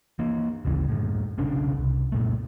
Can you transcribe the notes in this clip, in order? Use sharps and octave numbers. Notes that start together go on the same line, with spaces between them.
E3 A#3
G#1 D2 C#3 E3
F#2 A2
F1 B1 C#3 D4
C2
F#2 A#2 A3